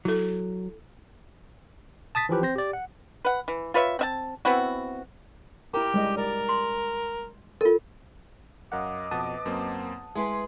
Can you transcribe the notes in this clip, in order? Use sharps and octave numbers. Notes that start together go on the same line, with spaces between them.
F#3 E4 A4
A5 D#6 A6 B6
E3 F3 G4 B4
C4 C5 A#6
G4 D5
F#5
B4 F#5
E3
F4 B4 C#5 E5
C4 E5 A5
B3 C4 E4 F#4
E4 G4 A#4 A#5
G3 G#3 D#5
A#4 D5
C6
F4 A4 A#4
F#2 A#4 D#5 F5 F#5 D6
F2 B2 B3 F#5 A5 D#6
F#2 A#3 C4
G#3 E4 G#4 B4 G#5 C6